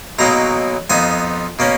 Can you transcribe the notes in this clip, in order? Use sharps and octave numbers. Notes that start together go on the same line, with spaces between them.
B1 B2 F#3 A#3 D#4 A#5
F2 F3 B3 D#4 G#5
B2 A#3 C#4